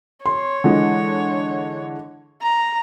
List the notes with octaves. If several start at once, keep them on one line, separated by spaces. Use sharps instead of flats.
C#5 C6
D3 E3 G#3
A#5